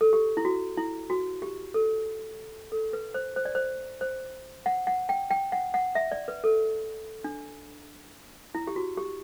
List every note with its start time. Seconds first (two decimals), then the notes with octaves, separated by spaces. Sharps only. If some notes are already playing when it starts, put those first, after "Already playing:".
0.01 A4
0.13 G4
0.37 E4
0.45 F#4
0.77 E4
1.10 F#4
1.42 G4
1.74 A4
2.72 A4
2.93 B4
3.14 C5
3.36 C5
3.45 D5
3.55 C5
4.01 C5
4.66 F#5
4.87 F#5
5.09 G5
5.31 G5
5.52 F#5
5.74 F#5
5.95 E5
6.12 D5
6.28 B4
6.44 A4
7.24 D4
8.55 E4
8.67 G4
8.76 F#4
8.97 G4